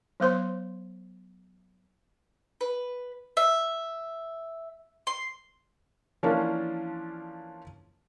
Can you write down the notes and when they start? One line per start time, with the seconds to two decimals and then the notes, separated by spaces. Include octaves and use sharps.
0.20 F#3 B3 C5 C6
2.61 B4
3.37 E5
5.07 C6
6.23 E3 F3 A#3 C#4 D4 F4